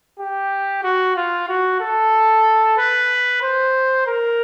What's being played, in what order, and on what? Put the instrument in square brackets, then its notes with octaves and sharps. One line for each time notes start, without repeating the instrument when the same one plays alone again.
[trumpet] G4
F#4
F4
F#4
A4
B4
C5
A#4